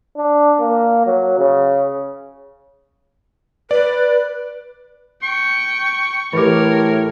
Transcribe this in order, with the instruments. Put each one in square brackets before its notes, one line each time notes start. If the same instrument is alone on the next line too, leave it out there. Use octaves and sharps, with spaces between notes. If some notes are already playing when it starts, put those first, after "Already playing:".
[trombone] D4
A#3
F#3
C#3
[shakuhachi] B4 [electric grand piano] D5
[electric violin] G5 [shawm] C#6
[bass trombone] A2 [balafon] E3 G4 [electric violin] A#4 C#5